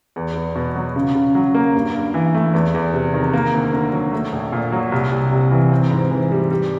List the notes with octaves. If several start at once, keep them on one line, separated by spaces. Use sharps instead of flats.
E2
E2
B2
F#3
C#3
C#3
F#3
A#3
G2
G2
E3
A3
E2
E2
C3
D#3
A#3
D2
D3
F#3
A3
A#1
A#2
F#3
C2
C2
C3
E3
C4
G#2
E3
G3
G3